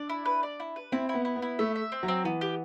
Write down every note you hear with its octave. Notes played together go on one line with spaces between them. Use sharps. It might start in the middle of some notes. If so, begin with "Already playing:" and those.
Already playing: D4 D5
E4
B4
D5
E4
B4
C4 E4
B3 E4
E4
B3
E4
A3 E5
E5
C4
F#3
C4
E3 B3
G4